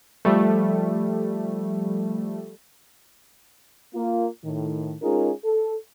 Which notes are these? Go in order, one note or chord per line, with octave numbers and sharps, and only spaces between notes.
F3 G3 A3
A#3 F4
A2 D#3
G#3 C#4 D#4 F4 G#4 A#4
A4